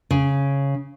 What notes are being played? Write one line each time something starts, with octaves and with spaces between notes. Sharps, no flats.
C#3